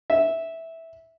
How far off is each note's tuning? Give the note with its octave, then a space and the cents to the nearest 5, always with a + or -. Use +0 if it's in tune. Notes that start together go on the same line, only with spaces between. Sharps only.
E5 -10